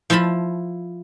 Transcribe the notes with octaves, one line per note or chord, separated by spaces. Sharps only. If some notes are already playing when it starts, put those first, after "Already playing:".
F3 E4 F4 A5 B5